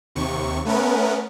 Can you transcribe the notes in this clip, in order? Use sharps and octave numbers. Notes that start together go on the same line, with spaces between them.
D#2 C3 C#6
A3 B3 C#4 A#4 B4